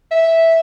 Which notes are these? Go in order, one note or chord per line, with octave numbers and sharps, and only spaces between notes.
E5